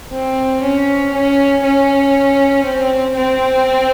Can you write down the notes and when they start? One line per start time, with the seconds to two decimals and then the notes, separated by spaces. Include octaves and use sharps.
0.12 C4
0.62 C#4
1.14 C#4
1.63 C#4
2.64 C4
3.16 C4